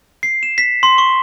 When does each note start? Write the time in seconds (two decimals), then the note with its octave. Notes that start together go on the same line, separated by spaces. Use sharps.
0.23 C7
0.43 E7
0.58 B6
0.83 C6
0.98 C#6